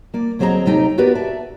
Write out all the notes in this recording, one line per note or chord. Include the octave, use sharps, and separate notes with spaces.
A#3 D5
D2 F#3 C4 G#4 D#5 A#5
D#2 C3 A3 D#4 G5 A#5
B3 F#4 G4 A#4 B4 D5
D5 E5 A5